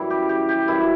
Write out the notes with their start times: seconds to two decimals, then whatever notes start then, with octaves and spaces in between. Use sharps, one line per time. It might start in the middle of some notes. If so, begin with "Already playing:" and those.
Already playing: F#2 E3 G3 E4
0.10 G4
0.29 G4
0.49 G4
0.67 F#2 E3 G3 E4